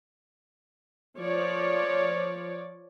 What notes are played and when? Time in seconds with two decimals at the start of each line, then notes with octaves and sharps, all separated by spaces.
1.19 F3 C#5 D5